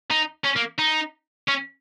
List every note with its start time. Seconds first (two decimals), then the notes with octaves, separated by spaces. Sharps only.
0.11 D#4
0.44 C#4
0.56 A#3
0.78 D#4
1.48 C#4